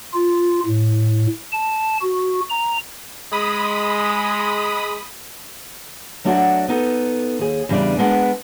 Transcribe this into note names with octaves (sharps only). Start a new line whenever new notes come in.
F4
A2
A5
F#4
A#5
G#3 B5 D#6
F#3 A3 D4 F#4 A#4 F#5
B3 D#4 A4
D#2 G#4
E2 C#3 G3 D4 D5
G#3 B3 D4 A#4 F#5